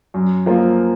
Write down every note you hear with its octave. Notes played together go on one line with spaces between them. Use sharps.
F#2
F3 A#3 F4